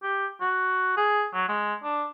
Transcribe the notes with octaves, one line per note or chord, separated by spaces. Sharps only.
G4
F#4
G#4
F#3
G#3
D4